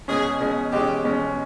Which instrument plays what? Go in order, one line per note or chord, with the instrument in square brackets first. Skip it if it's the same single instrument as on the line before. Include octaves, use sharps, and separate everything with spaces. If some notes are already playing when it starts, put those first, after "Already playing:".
[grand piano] B2 G#3 C#4 [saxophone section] G#4
[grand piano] B2 G#3 C#4
[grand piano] B2 G#3 C#4 [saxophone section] G4
[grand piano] B2 G#3 C#4